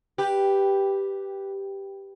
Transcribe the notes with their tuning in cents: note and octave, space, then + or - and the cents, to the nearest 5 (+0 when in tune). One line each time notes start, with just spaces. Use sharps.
G4 +0 B4 +0